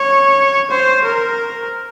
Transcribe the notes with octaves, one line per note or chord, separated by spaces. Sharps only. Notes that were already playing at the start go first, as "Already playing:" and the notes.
Already playing: C#5
C5
A#4